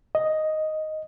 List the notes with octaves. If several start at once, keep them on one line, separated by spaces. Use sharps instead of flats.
D#5